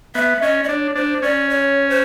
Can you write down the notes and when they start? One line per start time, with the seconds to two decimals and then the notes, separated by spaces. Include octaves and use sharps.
0.15 B3 E5
0.42 C#4 D#5
0.64 D5
0.69 D4 C#5
0.95 D4 C5
1.22 C#4 D5
1.50 C#5
1.90 C5